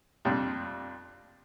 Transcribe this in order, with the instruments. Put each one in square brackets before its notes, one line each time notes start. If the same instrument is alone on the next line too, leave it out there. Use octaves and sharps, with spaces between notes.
[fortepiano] F2 C3 G3 D4